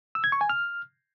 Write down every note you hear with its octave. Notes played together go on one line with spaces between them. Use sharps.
E6
G#6
C#6
G#5
F6